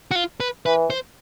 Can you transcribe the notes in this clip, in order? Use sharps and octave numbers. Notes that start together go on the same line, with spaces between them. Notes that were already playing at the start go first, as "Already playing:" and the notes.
F#4
F4
B4
E3 B4
C5